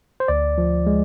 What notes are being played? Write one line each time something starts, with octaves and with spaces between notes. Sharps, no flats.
C5
D2 D5
F3
G#3